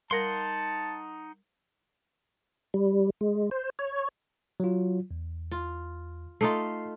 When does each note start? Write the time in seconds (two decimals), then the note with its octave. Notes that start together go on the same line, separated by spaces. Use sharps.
0.11 G3 D#4 A#4 F#5 A5 C6 A#6
2.74 G3
3.21 G#3
3.51 C5
3.79 C#5
4.60 F#3 F4
5.11 E2
5.51 F4
6.41 A3 D#4 F4 C7